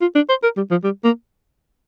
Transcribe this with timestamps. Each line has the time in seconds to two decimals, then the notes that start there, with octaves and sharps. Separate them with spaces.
0.01 F4
0.15 D4
0.29 C5
0.43 A#4
0.57 G3
0.71 F3
0.84 G3
1.04 A#3